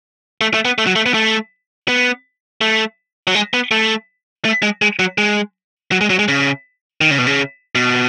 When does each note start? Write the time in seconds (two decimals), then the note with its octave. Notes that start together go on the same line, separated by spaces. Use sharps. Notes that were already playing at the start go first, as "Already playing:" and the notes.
0.41 A3
0.54 A3
0.65 B3
0.78 A3
0.87 F#3
0.96 A3
1.06 B3
1.14 A3
1.88 B3
2.61 A3
3.27 F#3
3.35 G#3
3.54 B3
3.71 A3
4.45 A3
4.63 G#3
4.82 G#3
4.99 F#3
5.18 G#3
5.92 F#3
6.01 G#3
6.10 F#3
6.19 G#3
6.28 C#3
7.01 D#3
7.11 C#3
7.18 B2
7.27 C#3
7.75 B2